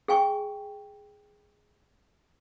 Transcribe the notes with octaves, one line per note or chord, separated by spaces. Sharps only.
G#4 G5 G#5 C#6